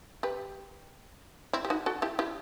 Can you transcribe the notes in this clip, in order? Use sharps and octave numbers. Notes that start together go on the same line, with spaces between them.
G4 B4
C4 E4
G4
D#4 F#4
F#4 A4
E4 G4
E4 G4